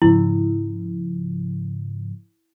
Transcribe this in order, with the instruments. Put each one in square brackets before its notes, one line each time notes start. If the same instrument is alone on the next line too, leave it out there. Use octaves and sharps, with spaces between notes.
[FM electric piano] G#2 C#3 F3 [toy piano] E4